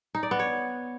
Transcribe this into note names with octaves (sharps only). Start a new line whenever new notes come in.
D#4
D5
B3
C#5